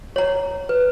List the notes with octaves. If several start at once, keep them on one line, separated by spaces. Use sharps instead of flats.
C#5 A#5
B4